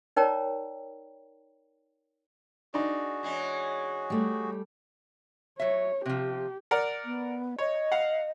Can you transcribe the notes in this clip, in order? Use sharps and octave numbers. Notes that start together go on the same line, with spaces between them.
D#4 A#4 C#5 D5 G5 A#5
D4 D#4 F#4 G#4
E3 G#3 C#4
G3 A3
F#3 C#5 E5
C3 F3 G4
A#4 D5 F#5
B3
C#5 D#5
F5 F#5